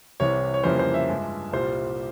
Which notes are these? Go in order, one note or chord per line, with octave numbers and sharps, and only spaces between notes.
C2 C3 E3 C#5
C#5
F2 C#3 E3 G3 A#3 C5
C5
E5
G2 F3 G#3
C2 A#2 G3 C5